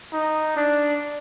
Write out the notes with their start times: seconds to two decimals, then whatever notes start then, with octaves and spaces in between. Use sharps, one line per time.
0.13 D#4
0.56 D4